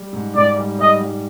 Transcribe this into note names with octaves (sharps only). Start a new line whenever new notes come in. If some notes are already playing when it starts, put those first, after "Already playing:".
Already playing: G3
G#2
G#2 D5
G3
G3 D#5
G3